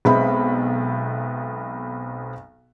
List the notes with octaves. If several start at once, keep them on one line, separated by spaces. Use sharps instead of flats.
B1 G#3 B3 C4 E5 B5